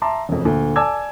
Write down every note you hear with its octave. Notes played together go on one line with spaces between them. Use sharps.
E5 A5 A#5 C6 D6
E1 F2
D2 A#2
D5 G#5 A5 D6 E6 G#6